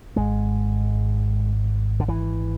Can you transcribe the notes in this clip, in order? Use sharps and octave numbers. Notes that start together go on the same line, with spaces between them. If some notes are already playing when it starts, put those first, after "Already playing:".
G#1 G#2 G#3
D3
E3